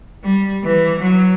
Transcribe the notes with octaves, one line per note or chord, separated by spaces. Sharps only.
G3
E3
F#3